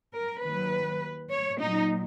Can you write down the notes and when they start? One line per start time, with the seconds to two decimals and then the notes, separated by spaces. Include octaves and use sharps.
0.14 A#4
0.43 D#2 D#3 F#3 B4
1.32 C#5
1.61 A#2 F#3 D#4